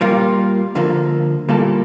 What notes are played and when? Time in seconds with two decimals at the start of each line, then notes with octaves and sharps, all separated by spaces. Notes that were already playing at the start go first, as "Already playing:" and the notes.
0.01 A#2 G3 A#3 F4
0.75 D2 D3 F3 A#3
1.49 A#2 G3 A#3 E4 A4